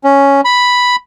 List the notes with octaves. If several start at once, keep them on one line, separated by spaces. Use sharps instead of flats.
C#4
B5